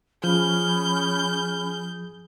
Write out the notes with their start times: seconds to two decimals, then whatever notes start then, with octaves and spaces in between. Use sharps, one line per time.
0.24 F3 C#4 G#4 B5 F6 G6